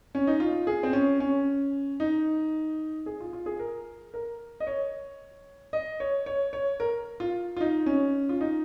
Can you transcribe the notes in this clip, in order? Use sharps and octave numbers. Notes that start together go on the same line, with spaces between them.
C#4
D#4
F4
G#4
C4
C#4
C#4
D#4
G#4
F4
F4
G#4
A#4
A#4
D#5
C#5
D#5
C#5
C#5
C#5
A#4
F4
F4
D#4
C#4
F4
D#4